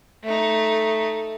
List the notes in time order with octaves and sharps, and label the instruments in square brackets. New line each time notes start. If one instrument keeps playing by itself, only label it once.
[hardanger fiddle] A3 D#4